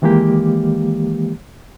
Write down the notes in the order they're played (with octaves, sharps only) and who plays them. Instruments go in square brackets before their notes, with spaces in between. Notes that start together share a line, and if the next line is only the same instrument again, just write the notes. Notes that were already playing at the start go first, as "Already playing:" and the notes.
[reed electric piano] D#3 E3 G#3 A#3 G4